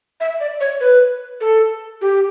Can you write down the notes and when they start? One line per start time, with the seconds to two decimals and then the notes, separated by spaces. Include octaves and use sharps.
0.20 E5
0.40 D5
0.60 C#5
0.80 B4
1.41 A4
2.01 G4